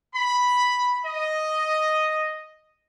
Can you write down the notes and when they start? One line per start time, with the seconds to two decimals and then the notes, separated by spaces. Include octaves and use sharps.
0.15 B5
1.06 D#5